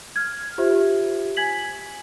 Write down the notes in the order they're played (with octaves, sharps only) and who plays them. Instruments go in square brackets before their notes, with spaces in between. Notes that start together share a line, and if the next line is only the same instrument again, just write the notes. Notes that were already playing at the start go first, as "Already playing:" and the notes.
[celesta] F6 G#6
F4 G4 C5 E5
G#5 G#6 B6 F#7